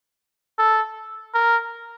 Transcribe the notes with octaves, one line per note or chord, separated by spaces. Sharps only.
A4
A#4